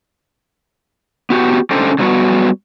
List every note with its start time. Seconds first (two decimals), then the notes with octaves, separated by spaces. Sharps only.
1.30 B3 F#4 G4
1.71 D3 C#4 D#4 G4 A4 C5
1.99 D3 F#3 G3 B3 F#4